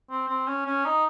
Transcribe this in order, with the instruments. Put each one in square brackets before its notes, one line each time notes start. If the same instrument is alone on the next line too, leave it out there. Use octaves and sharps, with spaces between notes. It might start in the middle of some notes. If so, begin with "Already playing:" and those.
[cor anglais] C4
C4
C#4
C#4
D#4